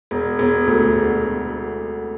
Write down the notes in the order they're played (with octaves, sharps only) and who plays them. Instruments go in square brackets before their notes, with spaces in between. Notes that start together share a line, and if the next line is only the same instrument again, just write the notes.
[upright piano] E1
E1
D2
E1